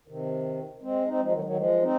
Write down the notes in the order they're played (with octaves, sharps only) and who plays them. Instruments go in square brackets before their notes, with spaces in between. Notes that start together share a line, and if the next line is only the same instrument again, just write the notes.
[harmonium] C3 D#3
G#3 C4
C4 D#4
F3 G#3
D#3 F#3
D#3 F#3
F3 G#3
C4 D#4